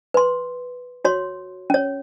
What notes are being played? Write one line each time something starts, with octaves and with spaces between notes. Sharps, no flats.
B4 C6
F#4 C#5 C6
C#4 C#5